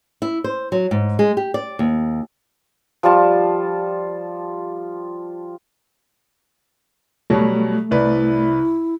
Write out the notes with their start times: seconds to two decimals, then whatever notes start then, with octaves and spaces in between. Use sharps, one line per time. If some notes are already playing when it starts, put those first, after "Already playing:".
0.22 E4
0.44 C5
0.72 F#3
0.91 G#2
1.19 G#3
1.37 G4
1.54 D5
1.79 D#2
3.03 F3 G3 F4 A5
7.30 B2 F#3 G3 A3
7.91 C2 E4 B4 D5